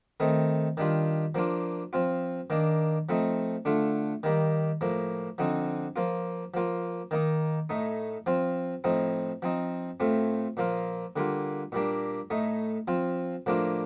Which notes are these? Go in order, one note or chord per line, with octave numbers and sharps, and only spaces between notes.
D#3 A3 C4 D#4
D#3 G3 D4 F4
F3 A#3 D4 F4
F3 C4 F4
D#3 A#3 D4
F3 A3 C4 D#4
D3 A3 D4 F4
D#3 G3 A#3
A2 F3 A#3
D3 F3 C4 D#4
F3 A#3 F4
F3 A#3 F4
D#3 A#3 D#4
A2 A3 D#4
F3 C4 F4
A2 F3 C4 D#4
F3 C4 D#4
A2 A3 C4 F4
A#2 F3 A#3 F4
D3 G3 A#3 F4
A#2 G3 A#3 D4
A2 A3 D#4
F3 C4 F4
A2 F3 A#3 D4 F4